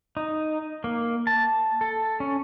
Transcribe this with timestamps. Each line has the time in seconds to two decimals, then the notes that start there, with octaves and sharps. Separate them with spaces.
0.17 D#4
0.84 A#3
1.27 A5
1.81 A4
2.20 C#4